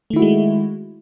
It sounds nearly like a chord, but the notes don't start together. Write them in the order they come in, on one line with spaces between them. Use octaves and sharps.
A3 D#3 E4 F#4 G#3